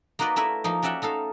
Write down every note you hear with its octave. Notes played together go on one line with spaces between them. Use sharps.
A#3 D#4 F#4 B4 D5 D#5
A3 E4 A#4 B4 E5
F3 A#3 D#4
C#4 F#4 D5 E5 F#5 G5
A3 D#4 A4 F5